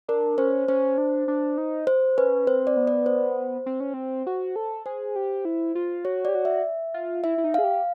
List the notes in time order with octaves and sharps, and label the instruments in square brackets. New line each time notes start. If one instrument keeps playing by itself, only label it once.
[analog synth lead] D4 [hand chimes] A#4
[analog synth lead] C#4 [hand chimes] C5
[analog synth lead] C#4 [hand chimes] C5
[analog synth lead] D4
D4
D#4
[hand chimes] C5
[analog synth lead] C#4 [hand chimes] B4
[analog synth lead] C4 [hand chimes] C5
[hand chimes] D5
[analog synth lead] B3
[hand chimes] D5
C5
[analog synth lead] C4
C#4
C4
F#4
A4
[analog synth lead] G#4 [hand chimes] C5
[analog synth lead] G4
E4
F4
[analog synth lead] F#4 [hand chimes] C#5
[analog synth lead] G4 [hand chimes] D5
[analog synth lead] F#4
[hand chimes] E5
[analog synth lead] F4
[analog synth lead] E4 [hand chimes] E5
[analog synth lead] E4
D#4
[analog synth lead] G#4 [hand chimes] F5
[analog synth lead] G4